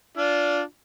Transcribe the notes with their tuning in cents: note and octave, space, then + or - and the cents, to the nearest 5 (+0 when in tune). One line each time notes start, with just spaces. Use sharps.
D4 -15 F4 +0